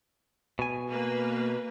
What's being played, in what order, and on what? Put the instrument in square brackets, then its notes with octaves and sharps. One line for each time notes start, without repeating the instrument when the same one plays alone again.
[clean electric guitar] B2 G#5
[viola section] A#3 B4